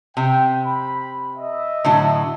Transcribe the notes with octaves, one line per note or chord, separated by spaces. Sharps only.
C3 G5
B5
D#5 E5
A2 D3 F#3